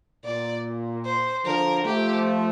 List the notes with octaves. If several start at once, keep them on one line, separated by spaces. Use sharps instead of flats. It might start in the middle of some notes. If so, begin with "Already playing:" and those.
A#2 D5
C5
D3 F3 A#4
F3 A3 G4